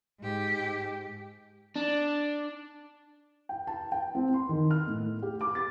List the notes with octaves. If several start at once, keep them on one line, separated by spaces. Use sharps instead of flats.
G#2 G4
D4
G5
A5
G5
C4
C6
D#3
F6
A2
G4
D6
A6